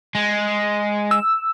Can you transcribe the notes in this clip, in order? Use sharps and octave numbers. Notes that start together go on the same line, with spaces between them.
G#3
E6